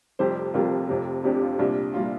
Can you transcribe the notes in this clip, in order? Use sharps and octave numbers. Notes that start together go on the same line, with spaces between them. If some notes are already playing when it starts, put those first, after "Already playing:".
F1 F2 C3 G3 G4 C5
F1 F2 C3 G3 F4 A#4
F1 F2 C3
F1 F2 C3 D4 G4
F4
C2 A#2 G3 D4
A#2 G3 F4